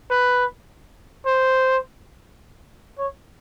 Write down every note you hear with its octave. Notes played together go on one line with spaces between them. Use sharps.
B4
C5
C#5